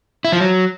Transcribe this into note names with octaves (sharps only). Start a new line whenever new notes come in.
E4
F3
F#3